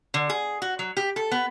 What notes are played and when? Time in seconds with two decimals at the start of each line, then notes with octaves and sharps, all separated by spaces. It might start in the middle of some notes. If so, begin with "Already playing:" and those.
0.14 D3
0.29 G#4
0.62 F#4
0.79 F#3
0.97 G4
1.16 A4
1.31 B3